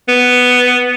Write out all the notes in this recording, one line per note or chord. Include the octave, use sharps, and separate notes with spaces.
B3